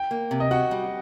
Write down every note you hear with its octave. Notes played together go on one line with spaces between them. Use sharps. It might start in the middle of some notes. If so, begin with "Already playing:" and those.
Already playing: G5
A#3
C3
D#5
F#4 F#5
G3